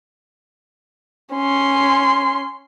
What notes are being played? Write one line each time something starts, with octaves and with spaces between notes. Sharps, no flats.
C#4 C6